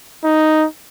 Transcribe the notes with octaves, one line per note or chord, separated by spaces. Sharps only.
D#4